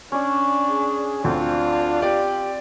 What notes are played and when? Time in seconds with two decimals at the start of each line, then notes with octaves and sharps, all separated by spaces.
0.12 C#4 D4 D5
0.70 G#4
1.24 D2 C4 D4 F4
2.02 G4 D5